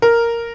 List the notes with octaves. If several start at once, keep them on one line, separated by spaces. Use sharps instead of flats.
A#4